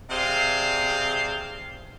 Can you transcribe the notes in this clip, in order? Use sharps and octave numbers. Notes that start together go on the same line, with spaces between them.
C3 G#4 C5 D5 F5